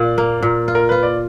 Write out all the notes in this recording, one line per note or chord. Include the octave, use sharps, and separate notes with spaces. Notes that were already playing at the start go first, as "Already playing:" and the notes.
Already playing: A#2 D5 F5
A#3
A#2
F4
A#4
F4 B4
D5